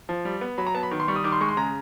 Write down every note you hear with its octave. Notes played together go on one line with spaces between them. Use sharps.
F3
G3
B3
F#3 B5
A#5
B3 A5
B5
D#3
C6
G3 C#6
D#6
D#3 D6
C6
G#3 C#6
C6
C#3 A#5